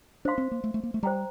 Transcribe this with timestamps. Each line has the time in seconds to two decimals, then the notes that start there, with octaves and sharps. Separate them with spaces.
0.25 D4 C5 F5 C6
0.38 C4
0.51 A#3
0.64 A3
0.74 A3
0.83 A#3
0.94 A3
1.03 G3 C5 G5 A#5